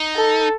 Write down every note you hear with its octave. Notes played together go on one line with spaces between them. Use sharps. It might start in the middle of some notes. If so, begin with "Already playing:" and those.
Already playing: D#4
A4